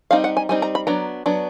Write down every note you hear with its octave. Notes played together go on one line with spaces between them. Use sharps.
G3 C4 D#4 F5
F#5
G#5
G3 C4 D#4 G#5
A#5
B5
F#3 B3 D4 A#5
F#3 B3 D4